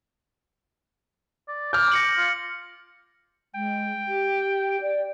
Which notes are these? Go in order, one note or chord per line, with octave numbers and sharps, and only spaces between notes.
D5
D6 F6 G6
A#6 C#7 F#7
F4
G#3 G5
G4
D5